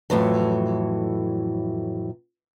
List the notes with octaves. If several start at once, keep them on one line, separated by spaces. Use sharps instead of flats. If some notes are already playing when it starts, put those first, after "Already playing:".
F2 A2 E3 F#3